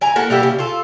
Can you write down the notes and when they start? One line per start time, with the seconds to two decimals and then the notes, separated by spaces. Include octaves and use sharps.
0.01 E4 G#5 A#5
0.16 A#3 E4 A4 F#5
0.30 G3 A#3 E4 G4
0.43 C#3
0.58 F4 A4